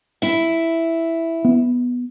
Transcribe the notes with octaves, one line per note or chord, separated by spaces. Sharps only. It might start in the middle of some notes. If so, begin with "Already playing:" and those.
E4 E5
B3